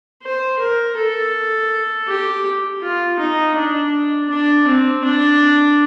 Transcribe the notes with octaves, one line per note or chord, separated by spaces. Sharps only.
C5
A#4
A4
G4
F4
D#4
D4
D4
C4
D4